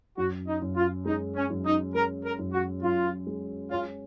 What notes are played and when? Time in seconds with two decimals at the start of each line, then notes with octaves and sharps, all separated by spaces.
0.17 F#2 F#4
0.47 D#4
0.62 F#2
0.76 F4
1.05 G#3 D#4
1.36 C#4
1.50 F#2
1.65 D#4
1.94 G#3 A#4
2.24 A#4
2.39 F#2
2.53 F#4
2.82 F#2 F4
3.27 G#3
3.71 C#4 F4